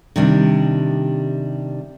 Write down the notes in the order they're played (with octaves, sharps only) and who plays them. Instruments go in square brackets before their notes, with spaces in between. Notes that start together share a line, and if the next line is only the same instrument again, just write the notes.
[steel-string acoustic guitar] C3 D#3 G3 D4